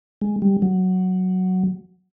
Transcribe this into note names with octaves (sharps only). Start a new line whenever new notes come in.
G#3
G3
F#3